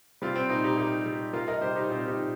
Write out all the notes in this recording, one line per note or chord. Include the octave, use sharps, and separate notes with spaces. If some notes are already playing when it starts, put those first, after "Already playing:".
G3 C4 F4
C4
A#2 D#4
D#4 G4
A#2 D#4 G4
G3
G3 F4 A#4
A#4 D#5
G3 G4 C5
D#4 G4
A#2 C4 F4
D#4 G4
A#2